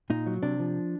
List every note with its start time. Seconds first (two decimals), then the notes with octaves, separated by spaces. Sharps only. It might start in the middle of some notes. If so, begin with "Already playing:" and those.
0.10 A#2 D#4
0.27 F#3
0.43 C3 D4
0.60 F3